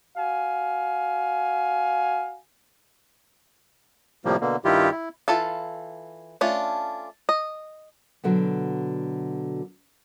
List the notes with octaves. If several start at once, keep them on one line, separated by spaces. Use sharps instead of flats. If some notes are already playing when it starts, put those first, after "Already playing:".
F#4 F5 G#5
A2 C3 F3 G3 A#3
B2 D3 A#3
G2 D#3 G3 E4 F4 G4
E4
E3 F4 A4 F5
A3 C#4 D4 F4
D#5
B2 D3 F#3 F#4